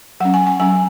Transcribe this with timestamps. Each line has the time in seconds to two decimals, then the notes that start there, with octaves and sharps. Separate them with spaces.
0.20 F#3 F#5
0.25 C#4
0.34 G#5
0.47 G#5
0.60 F#3 C#4 G#5